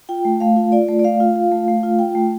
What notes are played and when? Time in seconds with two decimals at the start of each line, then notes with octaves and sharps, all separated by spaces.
0.09 F4 G5
0.25 A3
0.40 A3 F5
0.57 F4
0.72 F4 D5
0.88 A3
0.99 D5
1.04 A3 F5
1.20 F4
1.36 F4
1.52 A3
1.68 A3
1.83 F4
1.99 F4 G5
2.15 A3